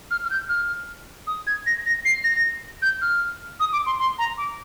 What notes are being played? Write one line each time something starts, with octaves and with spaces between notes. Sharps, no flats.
F6
F6
G6
F6
D#6
G#6
A#6
A#6
C7
A#6
G6
F6
D#6
D6
C6
C6
A#5
D6